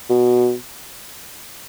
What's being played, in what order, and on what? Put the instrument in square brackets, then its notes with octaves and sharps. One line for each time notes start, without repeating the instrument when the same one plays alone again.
[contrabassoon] B2